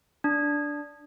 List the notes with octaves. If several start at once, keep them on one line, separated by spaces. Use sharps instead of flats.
D4